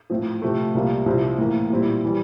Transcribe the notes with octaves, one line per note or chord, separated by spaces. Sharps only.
A2 F3 C4
C3 F3 A3
C2 C3 G3 A#3 F4
C2 C3 F3 C4 E4
A2 E3 A#3
A#2 G3 C4 E4
E3 G3